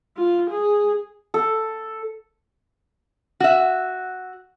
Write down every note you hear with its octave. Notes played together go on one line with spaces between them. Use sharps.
F4
G#4
A4
F#4 E5